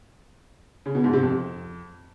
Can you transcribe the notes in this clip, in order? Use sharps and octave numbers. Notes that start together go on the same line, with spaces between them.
C#3
B2
G#2
C3
F2